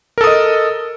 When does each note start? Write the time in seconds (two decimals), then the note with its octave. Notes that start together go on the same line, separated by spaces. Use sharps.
0.18 A#4
0.21 A4
0.24 D#6
0.27 D#5